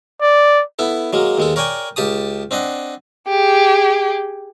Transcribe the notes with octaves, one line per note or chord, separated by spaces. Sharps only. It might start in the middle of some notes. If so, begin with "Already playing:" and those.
D5
B3 E4 A4
F#3 G#3 A#3
D#2 G#3 A4
A#4 C#5 D5 G5 G#5
C#2 G4 A5 D#6
C4 D4 D#5 F#5
G4 G#4